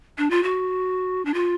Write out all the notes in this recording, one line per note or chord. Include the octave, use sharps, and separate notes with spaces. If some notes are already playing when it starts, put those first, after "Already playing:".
D4
F4
F#4
D4
F4